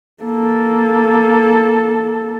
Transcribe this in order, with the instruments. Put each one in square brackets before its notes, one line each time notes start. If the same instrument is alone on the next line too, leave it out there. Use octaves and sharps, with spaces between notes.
[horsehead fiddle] A#3 A4